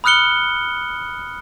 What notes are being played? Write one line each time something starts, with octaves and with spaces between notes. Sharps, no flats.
B5 D#6 F6 F#6 C#7 G7